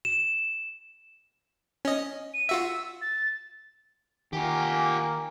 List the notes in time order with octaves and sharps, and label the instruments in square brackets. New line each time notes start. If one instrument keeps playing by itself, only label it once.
[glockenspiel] E7
[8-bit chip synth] C#4 D#5
[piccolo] D#7
[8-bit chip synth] F4 F#4 E5 [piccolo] E6
[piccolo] A6
[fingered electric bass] D#3 [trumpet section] A#3 [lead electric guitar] F4 G4 [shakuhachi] G#5